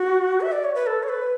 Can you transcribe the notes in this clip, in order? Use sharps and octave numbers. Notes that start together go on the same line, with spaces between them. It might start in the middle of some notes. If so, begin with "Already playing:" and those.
Already playing: F#4
E5
D5
C#5
B4
A4
C#5
B4